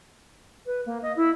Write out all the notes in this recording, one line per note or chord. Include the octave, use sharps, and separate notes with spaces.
B4
A#3
D#5
E4